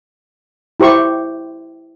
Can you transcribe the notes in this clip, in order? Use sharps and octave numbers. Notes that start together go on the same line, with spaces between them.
E4 G4 C5 C#6